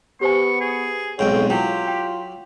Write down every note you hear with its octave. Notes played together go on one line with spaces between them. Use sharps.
B3 G4 C5 G#5 C#6
G#4
B1 F2 G#2 C#5 G5
F#3 E4 F4 G4 G5
G5